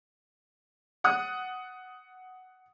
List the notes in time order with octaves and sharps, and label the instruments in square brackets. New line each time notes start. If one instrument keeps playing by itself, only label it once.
[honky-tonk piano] F#5 D#6 F#6